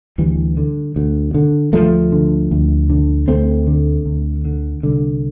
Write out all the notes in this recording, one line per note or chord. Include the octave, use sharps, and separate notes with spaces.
D2 E3 G3
D3
D2
D3
D2 F3 A3
D3
D2
D3
D2 A3 C4
D3
D2
D3
C2 D3